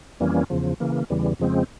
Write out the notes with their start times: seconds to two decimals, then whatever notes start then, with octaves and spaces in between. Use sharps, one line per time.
0.20 F2 E3 G3 A#3 C#4
0.50 E2 C#3 F3
0.80 C#3 E3 A#3
1.10 E2 C#3 E3 G3
1.39 F2 C#3 F3 G#3 C4